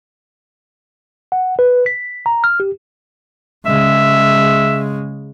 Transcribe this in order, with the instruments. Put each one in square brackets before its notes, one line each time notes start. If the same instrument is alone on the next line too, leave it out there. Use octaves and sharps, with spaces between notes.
[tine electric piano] F#5
B4
B6
A#5
F6
G4
[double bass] C#3 G#3 [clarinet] E5